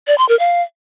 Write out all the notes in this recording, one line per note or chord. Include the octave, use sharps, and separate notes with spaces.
D5
C6
A#4
F5